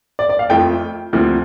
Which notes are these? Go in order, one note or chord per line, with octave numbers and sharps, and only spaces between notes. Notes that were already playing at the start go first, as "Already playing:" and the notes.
D5
D5
F5
F2 F3 A3 G5
D2 C3 F3